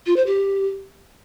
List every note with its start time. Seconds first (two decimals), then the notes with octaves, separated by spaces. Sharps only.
0.06 F4
0.16 C5
0.26 G4